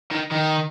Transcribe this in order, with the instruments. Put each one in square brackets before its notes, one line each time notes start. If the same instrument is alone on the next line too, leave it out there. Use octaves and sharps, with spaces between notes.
[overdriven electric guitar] D#3
D#3